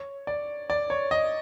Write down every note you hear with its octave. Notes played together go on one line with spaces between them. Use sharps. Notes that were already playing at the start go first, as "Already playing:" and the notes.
Already playing: C#5
D5
D5
C#5
D#5